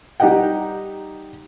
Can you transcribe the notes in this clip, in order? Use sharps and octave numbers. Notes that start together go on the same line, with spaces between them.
G3 D#4 G4 D#5 F#5 G5